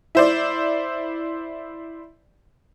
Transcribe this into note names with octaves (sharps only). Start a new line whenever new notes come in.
E4 C5 D5